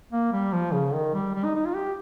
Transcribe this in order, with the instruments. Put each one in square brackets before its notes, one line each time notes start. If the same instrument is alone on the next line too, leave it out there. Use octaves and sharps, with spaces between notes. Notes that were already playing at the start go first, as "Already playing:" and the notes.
[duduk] A#3
G3
F3
C#3
D#3
G3
G3
D#4
D#4
F4
G4